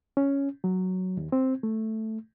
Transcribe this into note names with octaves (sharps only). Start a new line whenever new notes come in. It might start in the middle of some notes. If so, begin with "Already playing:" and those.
C#4
F#3
D#2
C4
A3